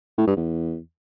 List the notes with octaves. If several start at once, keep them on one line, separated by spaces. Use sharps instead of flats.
A2
G2
E2